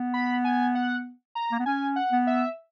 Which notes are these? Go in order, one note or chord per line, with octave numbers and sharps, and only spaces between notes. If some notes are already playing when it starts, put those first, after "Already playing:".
Already playing: B3
B5
G#5
F#5
A#5
A#3
B3
C#4 G#5
F#5
B3
E5